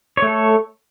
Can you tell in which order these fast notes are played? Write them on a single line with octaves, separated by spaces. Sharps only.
C#5 A3 A4